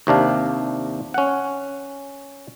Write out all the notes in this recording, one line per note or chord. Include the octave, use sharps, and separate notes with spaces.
D#2 C3 D4 F5
C#4 F#5